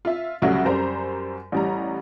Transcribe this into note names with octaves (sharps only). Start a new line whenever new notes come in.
F4 E5
D2 C#3 F#3 G3 F#4 E5
F#2 G3 C5 A#5
A1 G3 A#5